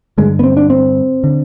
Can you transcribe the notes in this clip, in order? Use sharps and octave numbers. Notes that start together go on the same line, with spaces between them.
G2 D3 G#3
B3
C4
D4
C4
D3